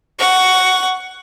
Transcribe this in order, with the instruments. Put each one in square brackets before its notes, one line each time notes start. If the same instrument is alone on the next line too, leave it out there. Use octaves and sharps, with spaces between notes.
[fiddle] F#5 C#6